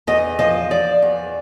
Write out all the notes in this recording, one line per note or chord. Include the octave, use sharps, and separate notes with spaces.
E2 D#5
F3 D#5
F3 D5
E2